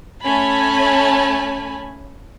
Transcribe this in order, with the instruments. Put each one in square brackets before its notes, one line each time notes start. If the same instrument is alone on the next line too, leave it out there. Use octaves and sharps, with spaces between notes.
[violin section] A3 C#4 G#5 A5 B5